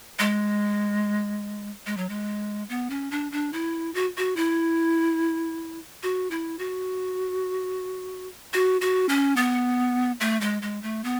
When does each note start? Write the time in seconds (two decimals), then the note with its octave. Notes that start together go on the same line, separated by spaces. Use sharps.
0.19 G#3
1.86 G#3
1.97 F#3
2.09 G#3
2.69 B3
2.90 C#4
3.11 D4
3.32 D4
3.53 E4
3.94 F#4
4.17 F#4
4.36 E4
6.03 F#4
6.31 E4
6.59 F#4
8.54 F#4
8.81 F#4
9.09 C#4
9.37 B3
10.20 A3
10.41 G#3
10.62 G#3
10.83 A3
11.04 B3